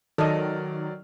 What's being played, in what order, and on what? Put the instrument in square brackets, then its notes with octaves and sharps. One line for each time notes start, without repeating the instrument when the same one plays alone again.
[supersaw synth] D#3 [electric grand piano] F#3 D5 F6 [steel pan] A4 D#5